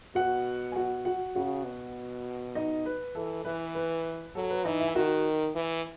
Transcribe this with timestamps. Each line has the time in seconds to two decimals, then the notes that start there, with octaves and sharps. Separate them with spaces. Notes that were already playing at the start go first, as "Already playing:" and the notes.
0.15 B2 F#4 F#5
0.72 G#5
0.76 F#4 F#5
1.05 F#4 F#5
1.35 C#3 F#4 F#5
1.65 B2
2.55 D#4 D#5
2.86 B4
3.15 E3 A4
3.45 E3 B4
3.75 B4
4.35 F#3 A4
4.50 B4
4.65 E3 D#4 D#5
4.80 E4 E5
4.88 G#5
4.95 D#3 F#4 F#5
5.55 E3